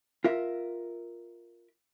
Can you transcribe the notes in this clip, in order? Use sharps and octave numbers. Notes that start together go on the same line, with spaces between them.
F4 A#4 E5